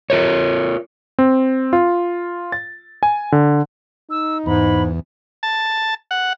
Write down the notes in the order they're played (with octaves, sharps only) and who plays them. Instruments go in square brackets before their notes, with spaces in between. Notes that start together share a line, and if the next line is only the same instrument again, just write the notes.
[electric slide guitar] F4 A#4 C#5
[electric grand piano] C4
F4
A6
G#5
D3
[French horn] D#4 [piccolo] E6
[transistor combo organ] E2 [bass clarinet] G#2 [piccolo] B5
[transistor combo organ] A5
F#5